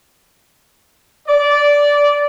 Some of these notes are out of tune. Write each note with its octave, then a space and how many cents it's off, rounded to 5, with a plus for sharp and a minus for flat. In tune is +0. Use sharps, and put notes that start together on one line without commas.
D5 -15